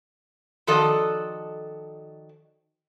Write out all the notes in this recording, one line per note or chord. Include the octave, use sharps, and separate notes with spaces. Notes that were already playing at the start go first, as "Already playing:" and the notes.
D#3 F3 F#4 A4 D5 D#5